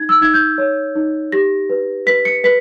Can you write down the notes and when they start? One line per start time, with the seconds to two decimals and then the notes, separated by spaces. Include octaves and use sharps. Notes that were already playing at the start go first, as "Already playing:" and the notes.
Already playing: D#4 G#6
0.09 E6
0.21 D#4 G#6
0.34 G6
0.58 C#5
0.96 D#4
1.32 G4 A#6
1.70 B4
2.06 B4 B6
2.25 C#7
2.44 B4 B6